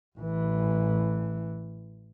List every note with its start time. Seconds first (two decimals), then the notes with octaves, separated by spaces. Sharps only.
0.18 A1 E3